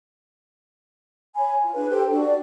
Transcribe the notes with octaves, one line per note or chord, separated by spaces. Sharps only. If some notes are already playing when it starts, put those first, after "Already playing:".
C#5 G#5 B5
F4
D4 G#4 B4
G4 A4 C5 G5
D4 F#4
D5